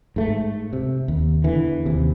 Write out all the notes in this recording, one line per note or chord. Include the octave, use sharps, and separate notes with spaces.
G#2 A3
C3
D#2
E2 D3 E3
D#2 C3